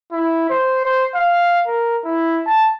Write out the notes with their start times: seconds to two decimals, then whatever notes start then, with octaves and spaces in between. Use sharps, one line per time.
0.12 E4
0.50 C5
0.85 C5
1.15 F5
1.67 A#4
2.05 E4
2.46 A5